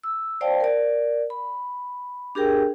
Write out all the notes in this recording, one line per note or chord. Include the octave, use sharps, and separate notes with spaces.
E6
C5 D5 F5 G5 A5
A#4 D5
B5
D4 G4 G#4 A#4 G5